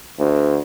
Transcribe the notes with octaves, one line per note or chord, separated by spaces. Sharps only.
D2